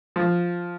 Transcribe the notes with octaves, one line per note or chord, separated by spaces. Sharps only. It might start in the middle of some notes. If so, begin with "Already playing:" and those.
F3